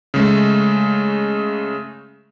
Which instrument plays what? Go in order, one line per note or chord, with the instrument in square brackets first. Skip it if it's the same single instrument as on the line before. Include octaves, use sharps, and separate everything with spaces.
[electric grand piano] C#3 G#3 A3